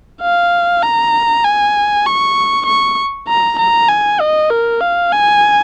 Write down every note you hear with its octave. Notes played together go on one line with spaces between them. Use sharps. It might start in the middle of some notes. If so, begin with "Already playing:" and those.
F5
A#5
G#5
C#6
C#6
A#5
A#5
G#5
D#5
A#4
F5
G#5